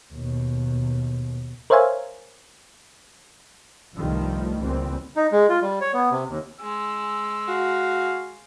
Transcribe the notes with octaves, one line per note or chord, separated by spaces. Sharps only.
D#2 B2
A#4 C5 C#5 E5 F5 G#5
C2 G2 D#3 F3 G3 A3
C#2 E3 G3 A#3 C4
D#4
G#3
F4
G3
C#5
B3
C3
D#2
G#3 E6
F#4 F5